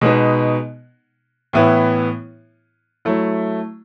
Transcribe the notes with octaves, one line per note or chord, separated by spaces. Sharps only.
B2 G#3 B3 D#4
A2 E3 B3 E4
F#3 A3 E4